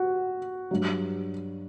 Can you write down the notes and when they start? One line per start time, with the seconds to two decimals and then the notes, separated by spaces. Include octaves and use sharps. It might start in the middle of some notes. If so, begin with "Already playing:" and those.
Already playing: F#4
0.71 G2 F#3